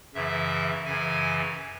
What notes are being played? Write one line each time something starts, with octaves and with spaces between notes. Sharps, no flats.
F#2 C#3 E3 E5
F#2 C#3 E3 G#5